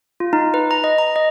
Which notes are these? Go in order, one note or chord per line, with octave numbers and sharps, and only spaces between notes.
F4
D#4
B4
A#5
D#5
A#5
D#5